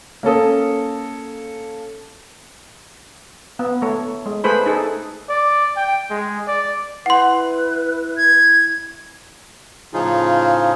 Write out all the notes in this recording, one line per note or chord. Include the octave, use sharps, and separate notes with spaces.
A#3 C#4 A4 D#6
B3
A3 C#5
G#3
A3 G#4 B4 C5 B5
D#4 G#4 A4
D5
G5
G#3
D5
E4 B4 F#5 C6
G#6
A2 C#3 F3 D#4 F4 G#4